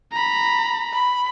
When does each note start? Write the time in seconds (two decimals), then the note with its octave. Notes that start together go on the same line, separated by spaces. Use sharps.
0.12 A#5 B5
0.94 B5